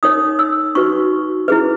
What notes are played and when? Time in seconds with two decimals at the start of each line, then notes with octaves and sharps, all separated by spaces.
0.03 D#4 A#4 C#5 D#6
0.39 E6
0.75 D#4 F#4 B4 C#6
1.48 E4 G#4 B4